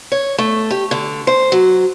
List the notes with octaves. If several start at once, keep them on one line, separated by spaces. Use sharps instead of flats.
C#5
A3
G4
D3
C5
F#3